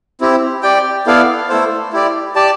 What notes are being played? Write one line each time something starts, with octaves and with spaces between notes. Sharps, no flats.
C4 E4 G4
G4 D5 G5
B3 E4 A4 D5 F5
A3 E4 A4 C5
E4 G4 D5
G4 D5 A5